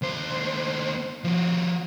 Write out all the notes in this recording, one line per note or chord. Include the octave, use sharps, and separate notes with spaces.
D#2 C5
F3 F#4